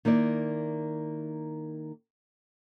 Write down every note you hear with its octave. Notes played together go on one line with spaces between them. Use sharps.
D#3 A#3 E4 D5